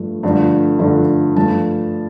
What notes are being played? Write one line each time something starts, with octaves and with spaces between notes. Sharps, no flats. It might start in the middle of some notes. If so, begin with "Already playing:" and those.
Already playing: G2 F3 A3
G2 D3 F3 A3
G2 D3 F3 A3
G2 F3 A3 A5